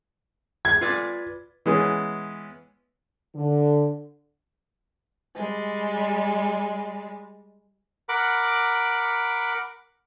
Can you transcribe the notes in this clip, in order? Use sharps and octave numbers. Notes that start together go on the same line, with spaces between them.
G#6
F4 B4 D5
E3 G#3 B3 C#4
D3
G3 G#3
A#4 F#5 B5 D6